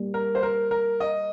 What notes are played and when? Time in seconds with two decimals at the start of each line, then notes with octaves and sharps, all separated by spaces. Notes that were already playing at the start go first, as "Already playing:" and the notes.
Already playing: G3 A#3
0.14 A#4
0.35 C5
0.43 A#4
0.71 A#4
1.00 D#5